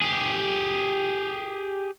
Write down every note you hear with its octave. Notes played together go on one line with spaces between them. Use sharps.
G4 G#4